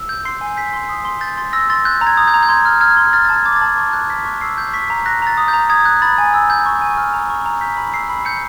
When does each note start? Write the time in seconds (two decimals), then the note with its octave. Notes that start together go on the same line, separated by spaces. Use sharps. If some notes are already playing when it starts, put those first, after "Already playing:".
Already playing: E6
0.09 G6
0.25 C6 C7
0.41 G#5
0.47 C7
0.57 G6 B6
0.73 C6
0.89 D#6
1.05 C6
1.21 G6 A6
1.37 C6 A6
1.53 E6 A#6
1.70 C6 A6
1.85 F#6 G6
2.01 A#5
2.07 G#6
2.17 D#6
2.28 G6
2.34 A#5
2.43 G6
2.49 C6 G#6
2.65 F6
2.81 F6 G#6
2.97 C6
3.13 F6 A6
3.25 A6
3.29 A5 G#6
3.45 D6 G#6
3.56 A6
3.61 A5 G#6
3.77 C#6
3.93 F#6
4.09 F#6 B6
4.25 C#6
4.41 E6 C7
4.58 G6
4.73 C#6 B6
4.90 A#5
5.06 F#6 A#6
5.22 A#5 A6
5.37 D#6
5.48 G6
5.53 A#5
5.69 D#6 G#6
5.85 F#6
6.02 B5 A6
6.18 G#5
6.34 E6
6.50 G6
6.66 C#6
6.82 G#5
6.97 F6
7.14 A#5
7.30 C#6
7.46 A#5
7.61 G6 B6
7.77 B5
7.93 E6 C7
8.09 B5
8.25 G6 C#7